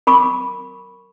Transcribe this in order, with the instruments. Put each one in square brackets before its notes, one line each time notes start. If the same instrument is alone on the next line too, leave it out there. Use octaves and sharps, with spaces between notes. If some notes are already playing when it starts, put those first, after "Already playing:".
[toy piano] A#4 B5 C#6 D6